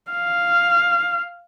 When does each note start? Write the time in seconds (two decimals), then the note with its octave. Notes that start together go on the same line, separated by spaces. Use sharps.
0.11 F5